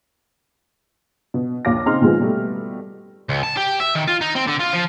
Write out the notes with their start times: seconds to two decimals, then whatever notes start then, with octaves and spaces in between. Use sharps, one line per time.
1.34 B2
1.65 A#1 D#2 F4 D6 A#6
1.86 C#3 C4 D#4 A#5 C6 F6
2.01 A#2 D#3 F3 G#3 B3
2.20 B2 G3 A3
3.29 C#2
3.43 A5
3.57 G4
3.80 E5
3.95 D#3
4.08 F4
4.21 D#4
4.35 C4
4.47 D3
4.59 F4
4.73 F3